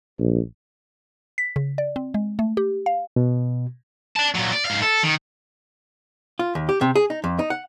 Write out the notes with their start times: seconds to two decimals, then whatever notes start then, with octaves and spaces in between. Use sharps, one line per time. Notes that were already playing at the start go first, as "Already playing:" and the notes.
0.19 A#1
1.38 B6
1.56 C#3
1.78 D5
1.96 C4
2.14 G#3
2.39 A3
2.57 G4
2.86 F5
3.16 B2
4.16 D5 A5
4.35 A#2 F#3
4.52 D5
4.65 G#2 F5
4.82 A4
5.03 D#3
6.39 F4
6.55 D#2
6.69 G4
6.81 C3
6.96 G#4
7.10 D#4
7.24 F2
7.39 D#4
7.50 F#5